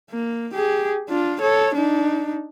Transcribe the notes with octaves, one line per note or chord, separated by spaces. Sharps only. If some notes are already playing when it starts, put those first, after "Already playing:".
A#3
G4 G#4
D4 F4
A4 C#5
D4 D#4